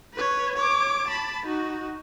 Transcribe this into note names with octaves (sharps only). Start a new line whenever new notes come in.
B4 C#5
C#5 D6
A5 B5
D#4 F#4